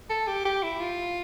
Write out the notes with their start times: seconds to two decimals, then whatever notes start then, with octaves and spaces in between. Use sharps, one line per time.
0.09 A4
0.27 G4
0.45 G4
0.63 E4
0.80 F4